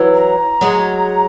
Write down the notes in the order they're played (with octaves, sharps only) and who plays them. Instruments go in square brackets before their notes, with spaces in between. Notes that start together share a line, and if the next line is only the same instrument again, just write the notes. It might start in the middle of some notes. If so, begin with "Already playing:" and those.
Already playing: [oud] E3 F#3
[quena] A#5
[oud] F#3 G#3